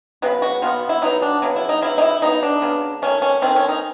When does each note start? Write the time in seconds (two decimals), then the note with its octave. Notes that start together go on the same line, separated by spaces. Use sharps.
0.22 C#3 F#3 B3 B4
0.42 F#4
0.62 B2 F#3 B3 F4
0.89 E4
1.02 B2 F#3 B3 D#4
1.22 D4
1.42 C#3 F#3 B3
1.56 E4
1.69 D#4
1.82 C#3 F#3 B3 E4
1.98 D#4
2.02 E4
2.22 C#3 F#3 B3 D#4
2.43 D4
2.62 C#3 F#3 B3
3.02 D#3 F#3 A3 C#4
3.22 C#4
3.42 D#3 F#3 A3 C4
3.56 C#4
3.69 D#4